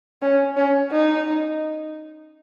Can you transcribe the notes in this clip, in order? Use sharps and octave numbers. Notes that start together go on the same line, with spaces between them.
C#4
C#4
D#4